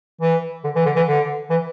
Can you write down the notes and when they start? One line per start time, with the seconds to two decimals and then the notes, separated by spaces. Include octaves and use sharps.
0.21 E3
0.64 D3
0.76 E3
0.86 D3
0.96 E3
1.07 D3
1.50 E3